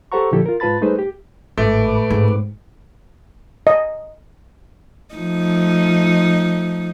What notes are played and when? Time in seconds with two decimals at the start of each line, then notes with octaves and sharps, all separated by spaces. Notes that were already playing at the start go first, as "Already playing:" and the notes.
0.12 G4 A4 C5 F#5 A#5 C#6
0.32 A#2 D3 F3 E4 G4 A4
0.46 F4 A#4
0.60 G#2 F4 B4 A5 B5 A6
0.81 G3 A3 D#4 G#4 B4 C5
0.98 G4
1.58 G#1 A2 A3 B4 D6
2.10 G#2 C4
3.67 D#5
5.15 F3 A3 D#4